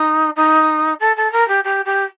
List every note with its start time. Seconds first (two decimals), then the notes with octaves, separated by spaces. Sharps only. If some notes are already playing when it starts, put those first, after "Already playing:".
Already playing: D#4
0.36 D#4
0.99 A4
1.16 A4
1.31 A#4
1.48 G4
1.64 G4
1.85 G4